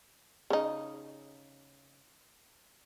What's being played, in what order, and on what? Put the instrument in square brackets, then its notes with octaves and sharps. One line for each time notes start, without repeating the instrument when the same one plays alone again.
[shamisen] C#3 D#4